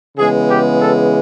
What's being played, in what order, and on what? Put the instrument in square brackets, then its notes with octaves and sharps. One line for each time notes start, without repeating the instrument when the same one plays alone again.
[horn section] C#3 E3 G#3 B3 G#4
G4
A4